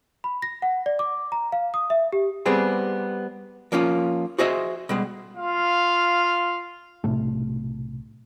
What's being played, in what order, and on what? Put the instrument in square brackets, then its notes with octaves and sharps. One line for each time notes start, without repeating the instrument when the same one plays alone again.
[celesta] B5
A#6
F#5
D5
D6
A#5
F5
D#6
E5
G4
[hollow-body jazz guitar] G3 B3 C4 G#4
F3 A#3 C#4 F4
F#4 G#4 C5 D#5 E5
B2 G3 G#3
[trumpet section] F4 F5
[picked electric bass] B1 A2 C3 A3